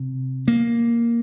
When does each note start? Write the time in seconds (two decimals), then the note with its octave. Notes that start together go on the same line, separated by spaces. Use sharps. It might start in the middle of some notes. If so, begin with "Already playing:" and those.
Already playing: C3
0.48 A#3